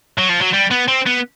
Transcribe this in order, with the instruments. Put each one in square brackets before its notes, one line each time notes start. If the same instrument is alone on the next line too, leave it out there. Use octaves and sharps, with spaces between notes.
[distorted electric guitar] F#3
F3
F#3
G3
B3
C4
B3